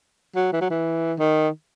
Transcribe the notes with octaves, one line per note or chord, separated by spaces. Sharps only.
F#3
E3
F#3
E3
D#3